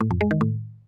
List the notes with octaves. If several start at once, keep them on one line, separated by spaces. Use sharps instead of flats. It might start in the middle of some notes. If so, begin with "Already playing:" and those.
A2
F2
G#3
D#3
A2